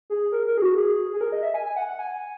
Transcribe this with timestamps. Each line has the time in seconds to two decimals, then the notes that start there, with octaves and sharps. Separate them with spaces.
0.10 G#4
0.32 A#4
0.47 A#4
0.58 G#4
0.62 F#4
0.76 G#4
1.13 G#4
1.21 A#4
1.32 D#5
1.43 E5
1.54 G#5
1.65 G#5
1.76 F#5
1.87 F#5
1.99 G#5